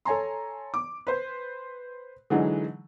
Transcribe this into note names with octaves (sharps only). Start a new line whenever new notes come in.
A4 C#5 G#5 A#5 C6
D6
B4 C5
D3 E3 F#3 G#3 D#4